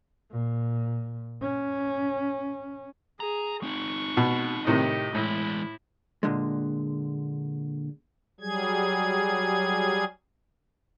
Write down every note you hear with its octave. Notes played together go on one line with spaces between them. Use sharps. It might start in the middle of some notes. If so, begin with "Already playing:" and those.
A#2
C#4
G#4 A#5
C4 D#4 C#6
B2
A2 C3 D#3 G4 D#5
A2 E3 G#3 E4
A#2 D3 G#3
F#3 G3 G#4 G#6